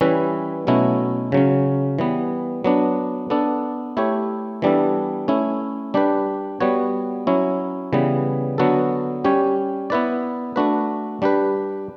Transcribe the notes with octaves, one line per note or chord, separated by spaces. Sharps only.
E3 G3 C#4 E4 B4
B2 F#3 A3 C#4 E4
C#3 F#3 C#4
E3 G3 B3
F#3 B3 D4
B3 D4 A4
A3 E4 G4 C#5
E3 G3 B3 D4 A4
A3 C#4 E4
G3 D4 G4 B4
G3 B3 F#4 C#5
F#3 C#4 E4
C#3 E3 G3 B3
D3 F#3 B3 F#4 A4
G3 C#4 G4 C#5
B3 E4 B4 D5
A3 D4 F#4 B4
G3 D4 G4 B4